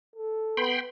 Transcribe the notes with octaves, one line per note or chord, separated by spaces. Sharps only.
A4
B3 G5 B5 C6